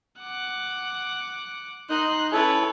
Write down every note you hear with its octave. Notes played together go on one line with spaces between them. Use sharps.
F#5 D6
D#4 C6 F#6
C#4 E4 A4 B4 C#5